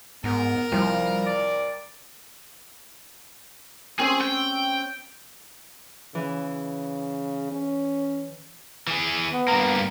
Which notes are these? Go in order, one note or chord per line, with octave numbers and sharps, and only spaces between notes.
G#2 B3 A#4
C2 F3 G3
D5
C4 C#4 G#4 C#5
G5
C#3 E3
C#4
E3 G#4
B3
G2 A#3 A#5